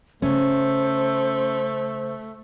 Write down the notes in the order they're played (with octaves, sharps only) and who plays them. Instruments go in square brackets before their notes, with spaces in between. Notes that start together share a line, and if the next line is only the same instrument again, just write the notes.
[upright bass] C#3 [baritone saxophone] A3 [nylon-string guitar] C#4 [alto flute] C5